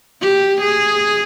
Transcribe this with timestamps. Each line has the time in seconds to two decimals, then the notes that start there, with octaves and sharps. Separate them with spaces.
0.21 G4
0.61 G#4